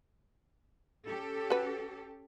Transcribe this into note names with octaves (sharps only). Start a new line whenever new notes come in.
C#4 G4 A4
F#4 B4